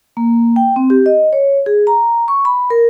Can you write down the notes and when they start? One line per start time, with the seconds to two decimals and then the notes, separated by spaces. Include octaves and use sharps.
0.17 A#3
0.56 G5
0.76 C4
0.90 G4
1.06 D#5
1.33 C#5
1.66 G#4
1.87 A#5
2.28 C#6
2.45 B5
2.70 A#4